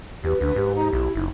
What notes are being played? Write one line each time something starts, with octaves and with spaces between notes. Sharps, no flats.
E2 G4 B4
D2 D4
G#2 G4
D#4
B1 E4
F#1 D#4